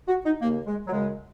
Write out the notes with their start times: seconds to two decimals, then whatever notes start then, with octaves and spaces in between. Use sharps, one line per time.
0.08 F#4
0.26 D#4
0.41 D#2 C#3 A#3
0.67 G#3
0.87 F#3
0.92 F#2 C#3 G#3